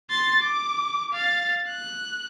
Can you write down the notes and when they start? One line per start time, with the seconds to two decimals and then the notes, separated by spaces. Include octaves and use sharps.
0.10 C6 A6
0.42 D6
1.13 F5 A6
1.68 F#6